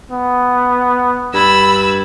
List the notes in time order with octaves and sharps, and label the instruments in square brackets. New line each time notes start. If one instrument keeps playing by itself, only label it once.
[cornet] B3
[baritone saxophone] G2 [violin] B5 E6